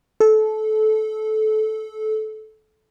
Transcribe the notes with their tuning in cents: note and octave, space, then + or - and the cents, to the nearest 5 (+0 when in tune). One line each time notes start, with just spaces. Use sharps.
A4 -20